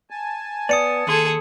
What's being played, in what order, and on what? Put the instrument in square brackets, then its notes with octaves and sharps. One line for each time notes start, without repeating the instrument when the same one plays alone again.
[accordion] G#5 A5
[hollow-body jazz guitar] B3 D5 [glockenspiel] D#6 C#7 D#7
[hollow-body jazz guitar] D#2 C6 [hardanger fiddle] G#4 A4